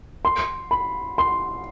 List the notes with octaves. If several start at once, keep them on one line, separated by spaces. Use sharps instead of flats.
C6
B5
C6